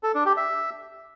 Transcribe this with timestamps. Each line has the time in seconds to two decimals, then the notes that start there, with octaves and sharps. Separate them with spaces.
0.03 A4
0.14 D4
0.26 G4
0.37 E5